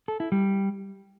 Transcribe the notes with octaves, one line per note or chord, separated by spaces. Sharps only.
A4
E4
G3